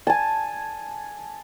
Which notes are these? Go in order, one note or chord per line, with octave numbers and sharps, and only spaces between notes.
G#5 A5